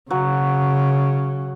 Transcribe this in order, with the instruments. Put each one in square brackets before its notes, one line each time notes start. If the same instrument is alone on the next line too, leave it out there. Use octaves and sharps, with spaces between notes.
[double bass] C#3 [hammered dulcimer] F#3